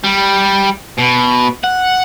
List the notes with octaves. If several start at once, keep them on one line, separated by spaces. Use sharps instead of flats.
G3
B2
F#5